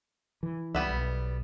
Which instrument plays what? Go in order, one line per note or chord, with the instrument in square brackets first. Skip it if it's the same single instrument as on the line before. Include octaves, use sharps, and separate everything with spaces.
[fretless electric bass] E3
[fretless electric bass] C#2 [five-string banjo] G3 B3 E5
[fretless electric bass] B1